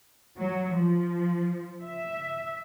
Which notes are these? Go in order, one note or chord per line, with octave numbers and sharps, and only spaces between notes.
F#3
F3
E5